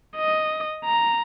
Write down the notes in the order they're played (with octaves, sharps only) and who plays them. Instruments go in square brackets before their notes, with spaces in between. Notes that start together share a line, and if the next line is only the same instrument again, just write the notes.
[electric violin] D#5
A#5